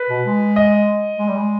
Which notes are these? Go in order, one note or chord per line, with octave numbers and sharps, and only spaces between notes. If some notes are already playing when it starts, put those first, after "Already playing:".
Already playing: B4
B2
G#3
D#5
G#3
G3
G#3